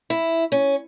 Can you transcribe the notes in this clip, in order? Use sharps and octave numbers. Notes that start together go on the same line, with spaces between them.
E4
C#4